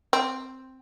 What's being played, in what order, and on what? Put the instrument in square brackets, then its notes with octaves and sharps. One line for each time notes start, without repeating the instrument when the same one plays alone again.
[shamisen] C4